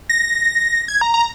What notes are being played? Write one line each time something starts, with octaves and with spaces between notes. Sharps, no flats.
A#6
G#6
A#5
A#5